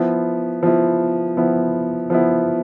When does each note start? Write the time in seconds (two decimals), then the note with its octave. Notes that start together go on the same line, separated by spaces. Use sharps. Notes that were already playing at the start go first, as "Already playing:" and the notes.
Already playing: F3 B3 E4
0.63 F3 B3 E4
1.37 F3 B3 E4
2.10 F3 B3 E4